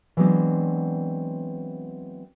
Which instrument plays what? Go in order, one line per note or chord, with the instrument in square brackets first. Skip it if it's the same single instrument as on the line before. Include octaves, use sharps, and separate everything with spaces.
[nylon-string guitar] E3 F#3 G#3 B3 C4 D4